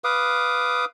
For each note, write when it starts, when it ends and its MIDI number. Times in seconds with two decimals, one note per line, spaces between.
0.04 0.85 71
0.04 0.85 77
0.04 0.85 86
0.04 0.85 87